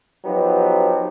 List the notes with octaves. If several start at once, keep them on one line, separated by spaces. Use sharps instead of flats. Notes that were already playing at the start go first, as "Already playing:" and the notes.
F3 F#3 B3 D#4 G4